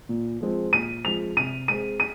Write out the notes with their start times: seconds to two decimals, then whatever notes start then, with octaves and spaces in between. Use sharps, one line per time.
0.09 A#2
0.41 F3 G#3 C4
0.73 A#2 D#7
1.05 F3 G#3 C4 F7
1.37 C3 D#7
1.68 G#3 C4 G#4 D#7
2.00 D#7